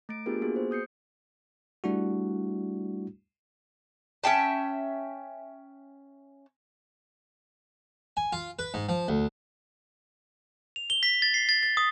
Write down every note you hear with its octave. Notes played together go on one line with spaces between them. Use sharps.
A3 A6 D7
B3 D4 F4 G4 G#4 A#4
A#3 B3 F#4 G#4
C5
D#6 G6 C7 C#7
G3 A3 D4 E4 F#4
C#4 E5 G5 A5
G#5
F4
B4
G#2
F3
D2
F7
G7
B6
A6
C7
A6
A6
D#6